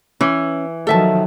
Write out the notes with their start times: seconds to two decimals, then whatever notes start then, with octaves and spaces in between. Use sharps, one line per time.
0.21 E3 C#4
0.87 D#3 F3 F#3 A4 E5 A5